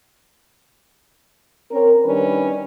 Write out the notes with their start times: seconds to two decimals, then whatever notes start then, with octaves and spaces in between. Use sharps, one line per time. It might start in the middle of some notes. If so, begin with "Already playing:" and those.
1.71 C4 C#4 A#4
2.05 D#3 G3 C#4 D4 B4